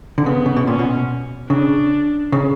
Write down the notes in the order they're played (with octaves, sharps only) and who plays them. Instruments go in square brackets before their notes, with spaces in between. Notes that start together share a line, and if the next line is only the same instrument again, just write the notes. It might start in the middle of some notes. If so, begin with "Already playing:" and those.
[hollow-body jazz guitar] D3
[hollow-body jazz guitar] C#3 [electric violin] B3
[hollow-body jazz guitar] C#3
B2
[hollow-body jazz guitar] A#2 [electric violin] C#4
[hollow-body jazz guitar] B2
[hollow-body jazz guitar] C#3 [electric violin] D4
[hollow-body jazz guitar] C#3